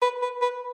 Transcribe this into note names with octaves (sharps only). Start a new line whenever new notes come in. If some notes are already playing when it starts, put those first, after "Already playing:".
B4
B4
B4